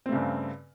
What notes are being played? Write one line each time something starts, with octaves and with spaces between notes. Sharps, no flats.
G2 C#3 A3 C4